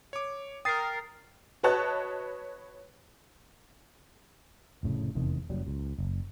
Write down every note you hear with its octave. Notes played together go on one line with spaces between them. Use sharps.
C#5 D6
A#4 G5 D#6 A6 C7
F#4 B4 C#5 D#5 A5 F#6
F1 A2 C#3
F1 E2 C3 D#3
F#1 F#3 G3
C#2
F#1